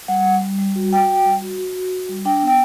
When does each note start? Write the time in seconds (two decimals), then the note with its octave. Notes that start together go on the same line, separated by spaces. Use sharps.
0.08 G3 F#5
0.26 G3
0.42 G3
0.59 G3
0.76 F#4
0.92 F#4 G5
1.09 F#4
1.25 G3
1.42 F#4
1.58 F#4
1.75 F#4
1.92 F#4
2.09 G3
2.25 D4 G5
2.42 B3
2.47 G5